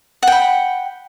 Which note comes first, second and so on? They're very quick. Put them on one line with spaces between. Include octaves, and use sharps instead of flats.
F#5 G5 B5